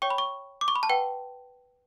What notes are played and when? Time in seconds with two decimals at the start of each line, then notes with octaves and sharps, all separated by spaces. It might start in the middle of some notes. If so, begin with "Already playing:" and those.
0.02 C#5 G5 C#6
0.10 B5
0.18 C#6
0.61 D6
0.68 C#6
0.76 B5
0.83 A5
0.89 B4 F#5 G5